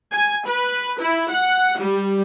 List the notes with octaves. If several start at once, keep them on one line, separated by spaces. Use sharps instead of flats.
G#5
B4
E4
F#5
G3